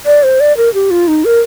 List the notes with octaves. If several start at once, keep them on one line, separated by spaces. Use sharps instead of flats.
D5
C5
D5
A#4
G4
F4
D#4
A#4